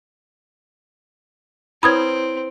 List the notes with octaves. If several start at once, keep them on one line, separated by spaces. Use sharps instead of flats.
C4 E4 B4 C#5 B5 D#6 G#6